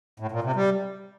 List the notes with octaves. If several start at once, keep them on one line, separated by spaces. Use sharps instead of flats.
A2
A#2
C3
G3